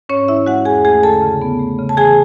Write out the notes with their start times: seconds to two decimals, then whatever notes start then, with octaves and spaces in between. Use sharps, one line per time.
0.09 G#2 C#4 C#5
0.28 E3 E4 E5
0.46 G#3 F#4 F#5
0.65 E2 G#4 G#5
0.85 A3 G#4 G#5
1.03 D3 A4 A5
1.22 C#3
1.42 B3
1.60 A3
1.79 C#3
1.89 A5
1.97 E3 G#4 G#5